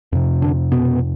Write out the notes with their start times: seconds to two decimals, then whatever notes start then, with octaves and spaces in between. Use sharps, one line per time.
0.12 F2 C3
0.42 D3 D4
0.72 B2 B3